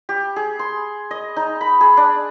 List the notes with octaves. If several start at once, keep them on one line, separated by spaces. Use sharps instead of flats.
G4
G#4
C6
D#5
D#4
B5
G#4
D4